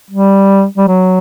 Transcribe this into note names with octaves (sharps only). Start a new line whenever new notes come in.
G3
G3
F#3